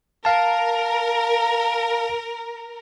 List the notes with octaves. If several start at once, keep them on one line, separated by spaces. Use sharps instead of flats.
A#4 F5 A5